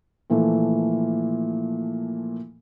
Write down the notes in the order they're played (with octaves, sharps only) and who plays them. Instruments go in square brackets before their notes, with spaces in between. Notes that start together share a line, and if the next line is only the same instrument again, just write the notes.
[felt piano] A#2 E3 F3 A3